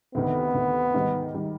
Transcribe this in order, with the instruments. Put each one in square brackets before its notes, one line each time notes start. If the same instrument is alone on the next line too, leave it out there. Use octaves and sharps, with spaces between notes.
[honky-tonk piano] D2 C3 D#3 [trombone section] B3
[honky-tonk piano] D2 C3 D#3
G#2 D#3 G3
D#3 G3